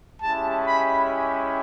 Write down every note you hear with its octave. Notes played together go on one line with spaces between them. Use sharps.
G#3 C#4 E4 G4 A5
B5